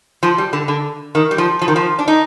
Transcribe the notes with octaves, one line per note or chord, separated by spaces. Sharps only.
F3
G3
D3
D3
D#3
G3
F3
F3
D#3
F3
D4
D#4